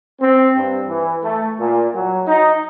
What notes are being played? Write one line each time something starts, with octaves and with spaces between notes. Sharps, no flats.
C4
G2
E3
A3
A#2
F#3
D#4